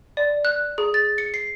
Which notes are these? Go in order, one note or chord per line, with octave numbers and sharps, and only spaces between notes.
D5
F#6
G#4
A6
C#7
C7